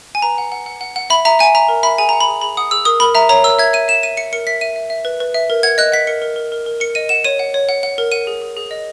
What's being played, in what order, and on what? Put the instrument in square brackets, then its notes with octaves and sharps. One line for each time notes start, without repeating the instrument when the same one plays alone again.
[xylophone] G#5
B4 A#5
F#5
F#5
F#5
F#5
F#5
E5 B5
E5 A#5
E5 G#5
E5 A#5
A#4
E5 B5
G#4 G#5
F#5 A#5
B5
G#4
G#4 B5
F#5 D#6
G#4 E6
A#4 D#6
A#4 B5
E5 A#5
C#5 A#5
A#4 E6
E5 G#6
E5 D#7
E5 E7
E5 D#7
E5 C#7
A#4 C#7
E5 B6
E5 D#7
E5
E5
B4
B4
E5
A#4
F#5 G#6
D#5 F#6
F#5 B6
A#4 C#7
A#4
A#4
A#4
A#4
A#4 C#7
D#5 D#7
F#5 E7
C#5 D#7
F#5
C#5
F#5
F#5
A#4
F#5 D#7
G#4
G#4
G#4
D#5